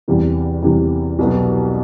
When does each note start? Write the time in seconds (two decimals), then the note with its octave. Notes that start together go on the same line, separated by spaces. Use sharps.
0.08 E2 C3 E3 G3
0.63 E2 C3 E3 G3
1.19 C2 B2 F#3 B3